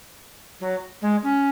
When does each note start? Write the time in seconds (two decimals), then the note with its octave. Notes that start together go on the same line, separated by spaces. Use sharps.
0.60 F#3
1.01 G#3
1.23 C#4